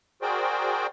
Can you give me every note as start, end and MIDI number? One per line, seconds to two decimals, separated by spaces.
0.22 0.87 66
0.22 0.87 68
0.22 0.87 70
0.22 0.87 72
0.22 0.87 74
0.22 0.87 79